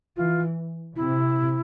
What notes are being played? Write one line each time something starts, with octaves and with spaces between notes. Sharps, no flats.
E3 F4
C3 E4